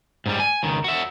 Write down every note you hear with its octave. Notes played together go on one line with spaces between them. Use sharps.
G#2 G3
G#5
C#2 D#3
F#4 E5